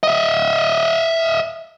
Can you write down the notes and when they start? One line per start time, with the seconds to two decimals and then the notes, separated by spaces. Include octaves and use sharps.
0.03 D#5 E5